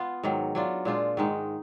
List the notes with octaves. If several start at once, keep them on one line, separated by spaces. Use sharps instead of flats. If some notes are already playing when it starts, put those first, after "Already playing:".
Already playing: B3 F4
G#2 D#3 F#3
F#3 D4 F4
A#2 G#3 D4 F4
G#2 D#3 G#3 D#4